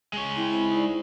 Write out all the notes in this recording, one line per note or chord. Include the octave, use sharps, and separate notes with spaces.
G#3 C#5
C4 E4 G5
C5 B5
D#4 C5 D5